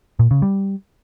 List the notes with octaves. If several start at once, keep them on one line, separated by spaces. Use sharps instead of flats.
A#2
C#3
G3